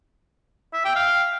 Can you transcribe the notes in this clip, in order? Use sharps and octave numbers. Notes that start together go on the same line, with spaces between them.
E5
G5
F5